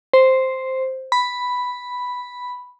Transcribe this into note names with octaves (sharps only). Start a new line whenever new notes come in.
C5
B5